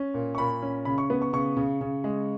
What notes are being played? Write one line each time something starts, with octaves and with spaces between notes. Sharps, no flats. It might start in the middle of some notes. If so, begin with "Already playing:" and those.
Already playing: C#4
A#2
C#6
A#2 B5
C#4
C#3 B5
C#6
B3
C#6
C#3 C#6
C#3
C#3
G#3